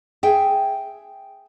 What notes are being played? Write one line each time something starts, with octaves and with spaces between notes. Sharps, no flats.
G#4 E5 G5